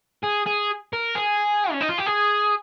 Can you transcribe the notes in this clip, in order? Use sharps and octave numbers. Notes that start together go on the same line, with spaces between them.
G#4
G#4
A#4
G#4
C#4
D#4
F4
G4
G#4